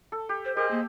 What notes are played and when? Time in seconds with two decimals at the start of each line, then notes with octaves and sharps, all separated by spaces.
0.12 A4
0.29 G4
0.45 C5
0.57 G4 G#4 A#4 C5 D#5
0.71 A#3